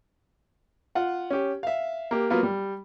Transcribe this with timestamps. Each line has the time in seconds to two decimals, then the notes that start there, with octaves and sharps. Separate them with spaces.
0.95 F4 F#5
1.30 C#4 G4
1.63 E5 F5
2.11 A#3 G4
2.30 F#3 A#3 B3 F4
2.43 G3